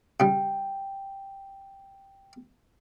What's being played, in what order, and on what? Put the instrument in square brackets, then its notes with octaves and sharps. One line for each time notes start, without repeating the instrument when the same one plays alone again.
[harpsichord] C#3 G3 [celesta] G5